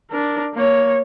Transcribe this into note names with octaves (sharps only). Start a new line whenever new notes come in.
D4 A#4
A#3 C#5